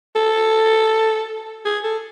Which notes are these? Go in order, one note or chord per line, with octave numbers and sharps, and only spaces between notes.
A4
G#4
A4